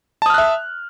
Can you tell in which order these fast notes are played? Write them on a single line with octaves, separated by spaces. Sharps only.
A5 D#6 F6 F#6 E5